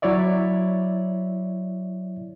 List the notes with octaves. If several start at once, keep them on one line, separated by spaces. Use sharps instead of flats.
F#3 E4 C#5 D5 E5